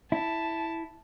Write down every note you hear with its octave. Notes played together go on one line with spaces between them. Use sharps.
E4 A5